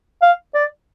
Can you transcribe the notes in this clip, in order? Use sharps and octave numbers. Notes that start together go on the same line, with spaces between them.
F5
D5